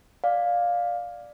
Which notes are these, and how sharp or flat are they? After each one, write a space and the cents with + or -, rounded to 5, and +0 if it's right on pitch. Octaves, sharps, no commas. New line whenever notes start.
D5 +0 F5 +10